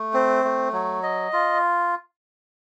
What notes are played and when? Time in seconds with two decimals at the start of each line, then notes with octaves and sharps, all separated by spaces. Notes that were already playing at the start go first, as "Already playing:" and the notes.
Already playing: A3
0.14 C4
0.44 A3
0.73 F#3
1.03 D#5
1.33 F4